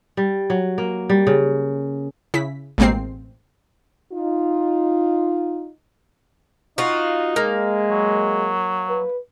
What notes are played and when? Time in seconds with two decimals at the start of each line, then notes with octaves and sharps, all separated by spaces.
0.17 G3
0.50 F#3
0.78 A#3
1.10 G3
1.27 C#3
2.34 C#3 E4 B6
2.78 A1 B2 G#3 A#3 C4 C7
4.13 D#4 F4
6.78 D#4 F4 F#4
7.36 G#3 A#3
7.90 F#3
8.89 B4